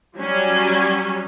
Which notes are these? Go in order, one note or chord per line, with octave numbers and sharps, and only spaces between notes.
F#3 G3 C#4